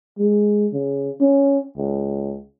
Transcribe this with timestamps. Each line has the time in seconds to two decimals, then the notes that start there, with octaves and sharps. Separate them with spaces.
0.18 G#3
0.73 C#3
1.21 C#4
1.77 C#2